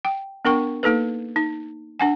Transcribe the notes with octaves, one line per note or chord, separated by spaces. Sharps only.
G5
B3 D4 A#4 G5 C#6
A#3 D#4 A4 B4
D#4
D4 F#5 G#5